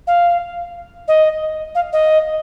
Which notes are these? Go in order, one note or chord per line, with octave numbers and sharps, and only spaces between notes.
F5
D#5
F5
D#5